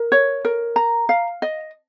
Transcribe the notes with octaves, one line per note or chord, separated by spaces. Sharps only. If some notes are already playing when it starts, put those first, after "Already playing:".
Already playing: A#4
C#5
A#4
A#5
F5
D#5